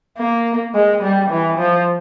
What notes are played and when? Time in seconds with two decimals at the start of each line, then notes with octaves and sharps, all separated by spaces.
0.18 A#3
0.74 G#3
1.02 G3
1.30 E3
1.58 F3